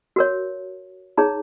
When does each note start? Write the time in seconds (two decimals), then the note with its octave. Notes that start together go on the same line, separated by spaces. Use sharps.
0.16 F#4 A#4 C#5
1.17 D#4 G#4 C#5 A#5